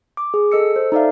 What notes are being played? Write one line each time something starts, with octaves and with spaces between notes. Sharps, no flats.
D6
G#4
A4 D#5 E6 C#7
C5
D#4 A4 D5 E5 F5